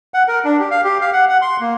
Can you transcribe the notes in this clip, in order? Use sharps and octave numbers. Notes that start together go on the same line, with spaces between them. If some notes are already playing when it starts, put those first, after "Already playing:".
F#5
A#4
D4
G4
F5
G4
F5
F#5
F#5
C6
A#3